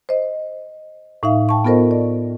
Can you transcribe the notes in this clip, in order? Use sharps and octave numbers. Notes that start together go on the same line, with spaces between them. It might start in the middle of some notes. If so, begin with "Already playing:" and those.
C5 D#5
A2 D#4 E5 F5
G5 A5 C#6
B3 F4 A4 A#4 C5 D#5
D5